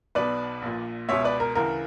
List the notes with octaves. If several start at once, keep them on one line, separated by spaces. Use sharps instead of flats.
B1 B2 B4 D5
A#1 A#2
C#2 B2 C#5 E5
B4 D5
A#4
D2 C#3 E3 A#4